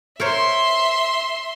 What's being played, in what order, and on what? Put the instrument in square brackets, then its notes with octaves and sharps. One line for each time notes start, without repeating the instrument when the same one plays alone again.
[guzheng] A#4 C5 C#5 [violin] E5 C6